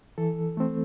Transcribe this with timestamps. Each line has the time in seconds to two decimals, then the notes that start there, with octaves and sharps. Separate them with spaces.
0.18 E3 A4
0.57 A3 C4